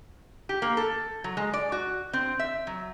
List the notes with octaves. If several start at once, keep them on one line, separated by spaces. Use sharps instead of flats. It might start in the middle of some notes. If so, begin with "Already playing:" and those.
G4
A#3
A4
F#3
G#3
D5
F#4
C4
E5
F#3